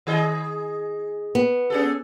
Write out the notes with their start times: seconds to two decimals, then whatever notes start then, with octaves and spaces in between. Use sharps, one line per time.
0.07 D#3 G#4 D#5
1.35 B3
1.70 C#4 G#4 A4